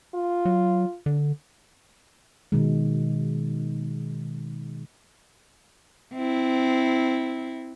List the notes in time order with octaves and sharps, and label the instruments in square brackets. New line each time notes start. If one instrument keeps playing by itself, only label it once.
[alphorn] F4
[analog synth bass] F#3
D3
[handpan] B2 D#3 G#3
[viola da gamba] C4 E4